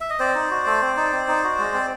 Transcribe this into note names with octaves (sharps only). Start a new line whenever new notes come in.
E5
D#5
C4 C5 D5
D#4
F#4
A3
C4
D#4
C4
D#4
F#4
G#3
C4